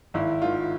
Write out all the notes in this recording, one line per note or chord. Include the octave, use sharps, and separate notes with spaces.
G#1 E4
G#2 D#3 F4